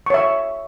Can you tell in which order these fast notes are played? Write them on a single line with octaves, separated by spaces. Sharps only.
C#6 C#5 E5